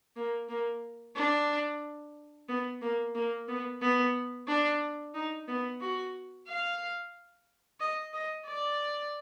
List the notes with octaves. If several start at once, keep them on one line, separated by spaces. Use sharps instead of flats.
A#3
A#3
D4
B3
A#3
A#3
B3
B3
D4
D#4
B3
F#4
F5
D#5
D#5
D5